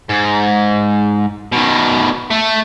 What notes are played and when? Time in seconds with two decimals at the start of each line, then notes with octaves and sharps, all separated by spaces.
0.09 G#2
1.52 B2 D#3
2.30 A3